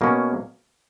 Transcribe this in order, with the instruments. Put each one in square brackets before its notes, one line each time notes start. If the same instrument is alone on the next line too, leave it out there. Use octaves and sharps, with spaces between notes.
[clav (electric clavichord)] B2 A#3 C#4